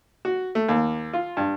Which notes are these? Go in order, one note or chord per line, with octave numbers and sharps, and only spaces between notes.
F#4
A3
D#2
F4
G2